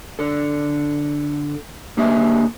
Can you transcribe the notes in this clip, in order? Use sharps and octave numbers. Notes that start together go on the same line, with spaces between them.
D3 A4
D3 A#3 G4 G#4 D#5 E5